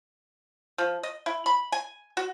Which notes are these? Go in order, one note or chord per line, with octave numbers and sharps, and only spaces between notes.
F3
D#5
E4
B5
G#5
F#4